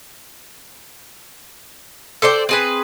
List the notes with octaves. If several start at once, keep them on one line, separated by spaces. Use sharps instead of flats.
A4 C5 D5 G5
C4 G#4 B4